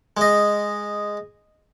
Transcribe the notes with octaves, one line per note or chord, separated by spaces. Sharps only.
G#3 D#5